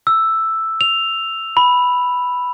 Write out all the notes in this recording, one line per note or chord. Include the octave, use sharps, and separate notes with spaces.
E6
F7
B5